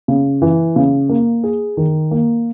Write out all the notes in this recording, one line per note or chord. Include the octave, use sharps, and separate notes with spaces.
C#3
E3
C#3
A#3
G#4
D#3
A#3